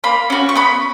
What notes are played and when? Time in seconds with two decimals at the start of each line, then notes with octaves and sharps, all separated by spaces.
0.04 A#3 B5
0.30 C#4 F#4
0.49 C#6
0.55 B3 B5